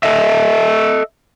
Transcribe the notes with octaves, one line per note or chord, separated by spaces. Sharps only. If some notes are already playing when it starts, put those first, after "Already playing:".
A4 D#5 E5